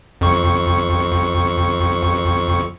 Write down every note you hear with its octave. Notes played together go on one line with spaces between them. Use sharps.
F2 C#6